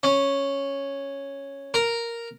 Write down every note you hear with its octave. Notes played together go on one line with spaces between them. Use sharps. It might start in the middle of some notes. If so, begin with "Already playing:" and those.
C#4
A#4